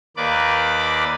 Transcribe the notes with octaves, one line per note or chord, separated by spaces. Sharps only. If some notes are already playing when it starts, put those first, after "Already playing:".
D#2 A#3 B4 D5 D6